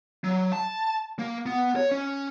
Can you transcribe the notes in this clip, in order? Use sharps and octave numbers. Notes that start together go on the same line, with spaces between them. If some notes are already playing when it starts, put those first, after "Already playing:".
F#3
A5
A#3
B3
C#5
C#4